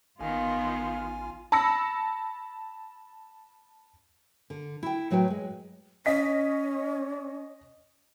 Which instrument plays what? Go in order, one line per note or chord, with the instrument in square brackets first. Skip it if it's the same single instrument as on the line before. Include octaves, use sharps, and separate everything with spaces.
[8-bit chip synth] A1 G#5 [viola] D#3 B3 [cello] F4 [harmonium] F5
[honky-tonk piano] A5 B5 E6 A#6 C#7
[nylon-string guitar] D3
E4 G5
A2 F#3 F#4 B4 G5
G#3
[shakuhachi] C#4 [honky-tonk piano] D#5 B6